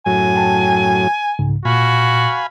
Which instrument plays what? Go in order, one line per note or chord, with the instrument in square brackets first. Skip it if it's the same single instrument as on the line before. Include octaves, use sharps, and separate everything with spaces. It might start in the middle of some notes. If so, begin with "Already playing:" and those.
[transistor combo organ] F#2 A2 F#3 [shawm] G#5
[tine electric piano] G5 A5
C2 G#2 C#3
[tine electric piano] A#2 [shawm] F#4 [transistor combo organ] F5 G#5 B5